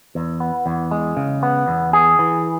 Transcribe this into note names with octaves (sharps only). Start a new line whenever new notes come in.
E2
B3
E2
G#3
C#3
B3
E2
G#4
E3